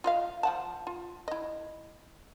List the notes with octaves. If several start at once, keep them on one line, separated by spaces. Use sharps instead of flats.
F4 D#5 F5
F3 F#5 A5
F4
E4 D#5